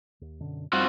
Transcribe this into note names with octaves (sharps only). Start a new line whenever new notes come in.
D#2
F#2 B2 D3
G2 G3 C4 F4 F#4